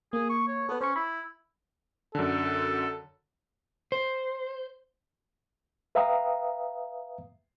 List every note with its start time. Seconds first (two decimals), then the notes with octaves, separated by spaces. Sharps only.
0.13 A#3 G#4
0.30 C#6
0.47 C#5
0.69 B3 A4 B4
0.81 C#4 C5 C#6
0.96 E4 B5
2.15 F#2 D3 A4
3.92 C5
5.95 B4 E5 F5 G5 A#5 D#6